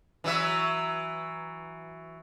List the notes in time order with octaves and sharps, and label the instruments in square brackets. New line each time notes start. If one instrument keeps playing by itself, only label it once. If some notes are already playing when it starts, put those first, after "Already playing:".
[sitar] E3 F#3 E5